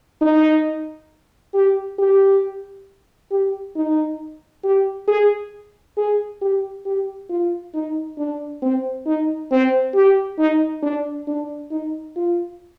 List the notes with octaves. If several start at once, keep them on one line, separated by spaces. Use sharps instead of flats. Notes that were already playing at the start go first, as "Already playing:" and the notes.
D#4
G4
G4
G4
D#4
G4
G#4
G#4
G4
G4
F4
D#4
D4
C4
D#4
C4
G4
D#4
D4
D4
D#4
F4